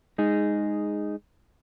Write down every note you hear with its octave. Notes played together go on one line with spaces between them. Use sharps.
G#3 D#4 G#4